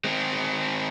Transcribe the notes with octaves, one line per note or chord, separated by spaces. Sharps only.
G#3 C4